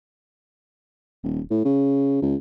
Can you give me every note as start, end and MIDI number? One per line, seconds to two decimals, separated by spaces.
1.23 1.40 27
1.50 1.63 45
1.65 2.21 49
2.22 2.35 37